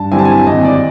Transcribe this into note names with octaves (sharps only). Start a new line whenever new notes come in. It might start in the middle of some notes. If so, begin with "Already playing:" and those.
Already playing: G2 A5
D3 G3 C4 E4 G#5
A5
G#5
G#1 D#5
D5